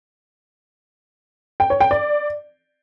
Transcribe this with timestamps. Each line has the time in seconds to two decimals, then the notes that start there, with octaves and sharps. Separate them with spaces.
1.60 G5
1.70 C#5
1.80 G5
1.91 D5